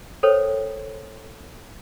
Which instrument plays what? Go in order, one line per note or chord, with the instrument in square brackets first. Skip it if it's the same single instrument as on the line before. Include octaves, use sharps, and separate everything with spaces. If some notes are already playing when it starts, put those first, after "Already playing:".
[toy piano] A4 A#4 C5 C#5 G5